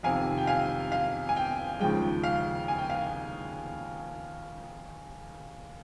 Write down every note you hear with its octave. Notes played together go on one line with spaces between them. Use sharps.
F2 C3 D#3 F5 G#5
G5
F5 G#5
F5
G#5
G5
D#2 C#3 F3 G#3 G5
F5
G#5
G5
F5